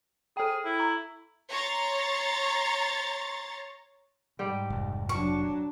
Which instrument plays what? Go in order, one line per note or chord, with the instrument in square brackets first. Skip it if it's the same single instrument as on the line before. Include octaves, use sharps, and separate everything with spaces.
[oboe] G#4 [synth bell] A4 G5
[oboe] E4
[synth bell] A#5
[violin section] C#5 A#5 C6 A6
[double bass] G#2 [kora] G3 G5
[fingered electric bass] F1
[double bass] F#3 D4 [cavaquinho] C#6